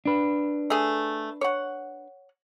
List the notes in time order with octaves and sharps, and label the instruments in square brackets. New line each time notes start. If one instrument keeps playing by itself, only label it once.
[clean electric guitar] D4 B4
[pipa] A3 G#4
C#5 F#5